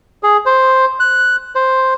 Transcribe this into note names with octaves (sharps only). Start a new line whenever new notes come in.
G#4
C5
F#6
C5